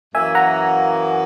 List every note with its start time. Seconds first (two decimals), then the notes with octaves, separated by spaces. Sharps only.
0.15 F#2 E3 A#3 E5 G#5
0.35 F#5 A#5